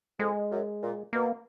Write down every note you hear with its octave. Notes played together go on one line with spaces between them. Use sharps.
F2 G#3
F#2
A#2
B2 A#3